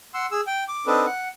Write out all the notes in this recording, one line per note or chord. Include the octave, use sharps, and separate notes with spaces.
F#5 C6 E6
G#4 E6
G5
D6
C4 D4 D#4 A4 B4
F#5